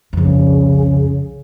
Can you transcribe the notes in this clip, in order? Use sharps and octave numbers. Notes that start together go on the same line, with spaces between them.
C2 F2 C#3